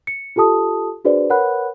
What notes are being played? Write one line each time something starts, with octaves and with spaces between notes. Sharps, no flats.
C#7
F4 G4 A4 A5 D#6
D4 F#4 G#4 B4 C5 D5
A#4 B4 C#5 F#5 B5 F#6